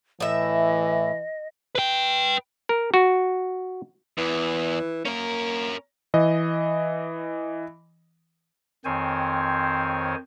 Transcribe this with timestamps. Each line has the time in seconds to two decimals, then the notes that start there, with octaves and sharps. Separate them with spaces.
0.20 A2 E3 D#5 E5
1.75 B4 G5
2.69 A#4
2.94 F#4
4.18 E2 E3
5.05 A#3 C#4 A#4
6.14 E3 D#5
8.85 F2 D#3 C4 C5 C#5 G#5